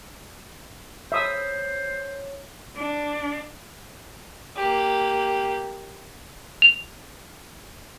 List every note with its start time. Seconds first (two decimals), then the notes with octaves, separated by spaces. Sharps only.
1.12 C5 C#5 E5 D#6 E6
2.76 D4
4.57 A#3 G4
6.62 F7